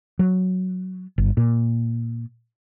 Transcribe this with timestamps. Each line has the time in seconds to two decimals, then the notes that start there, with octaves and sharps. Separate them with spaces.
0.19 F#3
1.18 G1
1.37 A#2